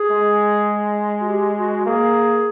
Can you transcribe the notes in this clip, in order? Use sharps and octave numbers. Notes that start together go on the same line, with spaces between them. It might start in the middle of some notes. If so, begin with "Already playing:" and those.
Already playing: G#4
G#3
F#4
G4
F#4
A#3 G#4